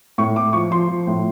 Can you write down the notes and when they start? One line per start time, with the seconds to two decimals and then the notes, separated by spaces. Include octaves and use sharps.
0.18 A2 C#6
0.35 A2 D6
0.53 F3 C#6
0.71 F3 C6
0.88 F3
1.07 A2